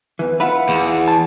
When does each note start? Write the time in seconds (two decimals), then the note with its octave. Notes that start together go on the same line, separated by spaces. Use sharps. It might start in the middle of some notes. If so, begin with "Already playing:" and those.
0.19 E2 E3 B4
0.40 E4 F4 B4 F#5
0.69 E2
1.08 A5